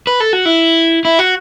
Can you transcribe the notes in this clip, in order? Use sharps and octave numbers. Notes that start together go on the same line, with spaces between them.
B4
A4
F#4
E4
E4
F#4